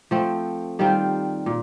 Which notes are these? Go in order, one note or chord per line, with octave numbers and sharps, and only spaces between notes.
F3 A3 C4
D#3 G3 C4 F4
A#2